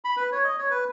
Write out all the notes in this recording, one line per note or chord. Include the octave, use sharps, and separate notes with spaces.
B5
B4
C#5
D#5
C#5
B4